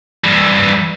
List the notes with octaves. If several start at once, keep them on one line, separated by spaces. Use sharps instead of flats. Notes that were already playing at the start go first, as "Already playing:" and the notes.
G2 E3